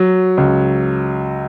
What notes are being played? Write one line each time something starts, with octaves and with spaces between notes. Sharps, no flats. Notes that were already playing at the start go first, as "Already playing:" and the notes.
Already playing: F#3
C#2